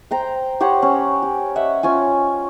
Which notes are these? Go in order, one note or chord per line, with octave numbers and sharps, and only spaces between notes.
C5 G5 A#5
G4 C5 C#5 F#5
C#4
G4
D#5 E5 F#5
C#4 F4 G#5